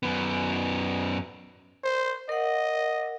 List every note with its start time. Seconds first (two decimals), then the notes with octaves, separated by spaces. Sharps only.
0.03 F#2 B3
1.84 C5
2.29 A#4 D#5 F#5